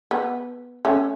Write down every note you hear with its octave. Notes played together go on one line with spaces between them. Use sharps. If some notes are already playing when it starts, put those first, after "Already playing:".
B3
A3 C#4